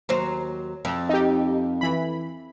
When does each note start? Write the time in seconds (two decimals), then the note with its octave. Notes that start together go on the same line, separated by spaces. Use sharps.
0.09 D#2 F#3 C5
0.85 F2
1.09 D#4 G4
1.81 E3 B5